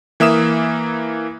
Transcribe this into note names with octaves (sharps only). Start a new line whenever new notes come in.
E3 A#3 E5 D#6 E7